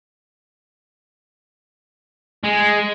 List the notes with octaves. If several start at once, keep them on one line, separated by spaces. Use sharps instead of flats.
G#3